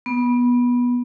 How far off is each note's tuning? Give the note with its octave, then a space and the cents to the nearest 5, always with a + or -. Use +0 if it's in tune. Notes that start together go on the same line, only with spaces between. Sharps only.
B3 -15